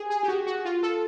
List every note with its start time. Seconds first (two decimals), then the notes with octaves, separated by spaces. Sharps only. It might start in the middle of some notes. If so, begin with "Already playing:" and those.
Already playing: G4 G#4
0.10 G#4
0.23 G4
0.28 F#4
0.47 F#4
0.65 F4
0.83 A4